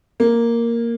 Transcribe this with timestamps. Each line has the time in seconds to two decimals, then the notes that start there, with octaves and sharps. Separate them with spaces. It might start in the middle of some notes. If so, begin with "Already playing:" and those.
0.20 A#3